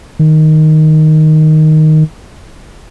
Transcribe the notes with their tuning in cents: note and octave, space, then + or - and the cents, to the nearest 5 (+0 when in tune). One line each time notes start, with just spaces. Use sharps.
D#3 +0